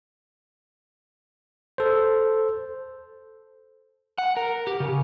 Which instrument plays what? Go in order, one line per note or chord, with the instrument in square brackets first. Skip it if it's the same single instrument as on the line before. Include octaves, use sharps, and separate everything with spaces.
[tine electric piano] A4 C5
[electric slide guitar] F#5
A#4
G4
C#3